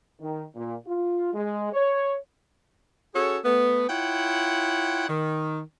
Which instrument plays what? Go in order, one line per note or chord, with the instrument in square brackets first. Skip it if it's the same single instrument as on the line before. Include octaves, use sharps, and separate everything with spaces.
[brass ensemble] D#3
A#2
F4
G#3
C#5
[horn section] C#4 F#4 G#4 A4 C#5
A3 B3
E4 F4 C#5 F#5 G5
D#3